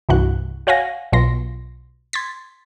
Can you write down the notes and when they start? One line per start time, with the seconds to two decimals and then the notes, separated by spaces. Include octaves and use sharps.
0.09 C2 G2 C3 E3 F#4 F#6
0.67 F#4 C#5 F5 F#5 G#5 A#6
1.12 B1 B2 F#3 F4 C6 A#6
2.13 C6 G#6 A6 B6